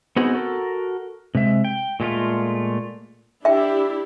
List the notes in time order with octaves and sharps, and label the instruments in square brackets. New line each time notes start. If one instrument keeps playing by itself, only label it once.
[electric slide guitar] B3 C4 D#4 F#4 G#4
F#4 A4 A#4
C3 G#3 E5
G5
A#2 G#3 A3 F4
[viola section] D4 E4 G4 [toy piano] E5 G5